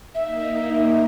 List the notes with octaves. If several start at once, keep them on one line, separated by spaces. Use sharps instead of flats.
A#3 D#4 E5